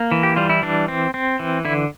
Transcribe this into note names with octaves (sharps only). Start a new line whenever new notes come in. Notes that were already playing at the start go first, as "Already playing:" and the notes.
Already playing: A#3
E3
G4
G3 F4
E4
E3 D4
C4
C4
E3
D3 E4